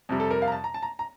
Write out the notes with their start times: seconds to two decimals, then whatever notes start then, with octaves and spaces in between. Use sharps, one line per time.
0.09 F2 C3 G3
0.20 A4
0.31 A#4
0.42 F5
0.48 A#5
0.52 A5
0.64 A#5
0.74 A5
0.83 A#5
0.99 A#5